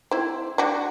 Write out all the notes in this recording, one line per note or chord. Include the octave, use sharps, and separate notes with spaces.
C4 E4
D4 F#4